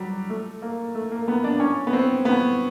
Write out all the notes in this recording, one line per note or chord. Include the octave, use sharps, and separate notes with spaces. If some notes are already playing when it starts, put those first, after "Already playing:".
Already playing: F#3 G3
A3
A#3
A3
A#3
B3
D4
C#4
B3
C4
B3